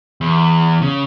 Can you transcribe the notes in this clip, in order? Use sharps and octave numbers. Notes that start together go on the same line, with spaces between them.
E2
C#3